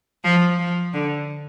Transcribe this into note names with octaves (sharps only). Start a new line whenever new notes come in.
F3
F3
D3